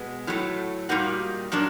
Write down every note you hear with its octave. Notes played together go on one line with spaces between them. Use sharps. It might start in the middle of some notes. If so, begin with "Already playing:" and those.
Already playing: B2 G#3 B3
A2 F#3 A3
A#2 G3 A#3 D#4 F#4
A#2 F#3 A#3 D4